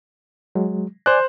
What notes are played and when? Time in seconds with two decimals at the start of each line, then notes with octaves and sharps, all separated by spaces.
0.55 F#3 G#3
1.06 C5 D5 G#5 F#6